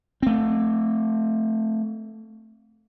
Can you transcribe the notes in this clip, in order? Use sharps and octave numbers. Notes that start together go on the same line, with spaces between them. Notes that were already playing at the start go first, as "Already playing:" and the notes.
A3 C4